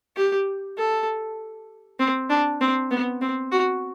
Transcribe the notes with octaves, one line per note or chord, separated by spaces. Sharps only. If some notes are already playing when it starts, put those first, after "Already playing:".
G4
A4
C4
D4
C4
B3
C4
F#4